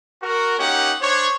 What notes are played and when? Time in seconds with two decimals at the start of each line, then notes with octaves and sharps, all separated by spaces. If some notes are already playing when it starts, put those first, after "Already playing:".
0.23 F#4 A#4
0.59 A#3 C#4 D#4 G4 F#5
1.02 D4 C5 C#5